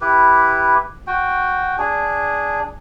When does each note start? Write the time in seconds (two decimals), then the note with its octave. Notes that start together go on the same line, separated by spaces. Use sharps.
0.01 E4 G4 B4
1.07 F#4 G5
1.78 D4 G#4